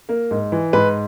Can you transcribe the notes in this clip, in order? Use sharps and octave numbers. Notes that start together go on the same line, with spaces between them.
A#3
G#2
E3
G#2 B4